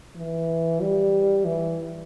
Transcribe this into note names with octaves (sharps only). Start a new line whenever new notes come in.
E3
G3
E3